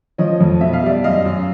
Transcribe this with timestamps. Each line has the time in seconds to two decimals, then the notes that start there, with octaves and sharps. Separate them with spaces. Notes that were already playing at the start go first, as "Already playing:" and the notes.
0.18 F3 C#5 D#5
0.41 F2
0.61 B2 E5
0.73 F5
0.83 G3 D5 E5
1.04 F#2 D#5 F5
1.25 F#2